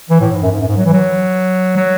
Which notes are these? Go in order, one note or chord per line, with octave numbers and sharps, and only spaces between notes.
E3
A2
G#2
F#2
G#2
F#2
G#2
F#3
E3
F#3
F#3